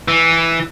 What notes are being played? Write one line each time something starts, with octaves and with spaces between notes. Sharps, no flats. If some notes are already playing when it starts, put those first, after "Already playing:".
E3